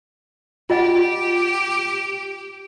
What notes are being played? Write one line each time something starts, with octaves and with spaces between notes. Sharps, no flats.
F4 G4 D#5 F#5